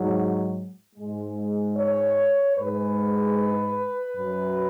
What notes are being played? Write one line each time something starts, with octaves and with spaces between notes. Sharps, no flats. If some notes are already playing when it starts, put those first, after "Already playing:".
Already playing: G#2 F#3
G#2 G#3
C#5
G#2 G#3 B4
F#2 F#3